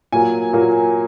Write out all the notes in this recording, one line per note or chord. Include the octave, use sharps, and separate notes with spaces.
A#2 F#3 A#3 G#5
A#2 F#3 A#3